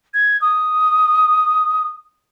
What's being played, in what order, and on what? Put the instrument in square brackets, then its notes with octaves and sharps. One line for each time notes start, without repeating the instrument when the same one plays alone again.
[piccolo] G#6
D#6